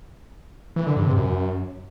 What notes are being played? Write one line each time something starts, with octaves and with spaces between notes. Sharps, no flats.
E3
D3
G2
C3
F#2